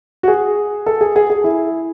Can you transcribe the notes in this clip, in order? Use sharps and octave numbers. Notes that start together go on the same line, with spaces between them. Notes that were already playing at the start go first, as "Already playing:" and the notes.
F#4
G#4
A4
G#4
G#4
G#4
E4